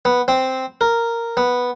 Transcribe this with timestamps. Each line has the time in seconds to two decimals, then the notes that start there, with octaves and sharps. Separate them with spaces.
0.05 B3
0.28 C4
0.81 A#4
1.37 B3